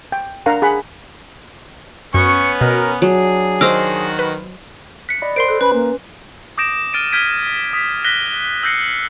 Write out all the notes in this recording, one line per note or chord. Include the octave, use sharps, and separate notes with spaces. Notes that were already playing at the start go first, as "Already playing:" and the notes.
G5
D4 A#4 F5 F#5 A#5
G#4 F#5 B5
F#2 B3 C#4 C#6
B2 A#4
F#3 D4 G#4
D#3 F#4 C5 D#5 D6 E6 F6
B4
F#6 B6 C#7
D5 D#5 B5
A#4 C5 C6 C7 D7
A4 F#6
C#4 B4 B5
A#3
D6 D#6 G6 A#6 D7 E7
F6 A6 D7 D#7
F6 G6 G#6 B6 D7 D#7
D#6 B6
F#6 A#6 B6 G7
E6 F#6 G6 A#6 C7 C#7